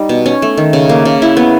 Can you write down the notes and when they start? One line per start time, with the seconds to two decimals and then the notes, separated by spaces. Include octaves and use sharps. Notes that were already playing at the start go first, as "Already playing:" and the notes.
Already playing: G3 D#4
0.09 B2
0.26 C#4
0.42 A3
0.57 D#3
0.73 C#3
0.89 A#3
1.05 C#3
1.22 E4
1.37 B3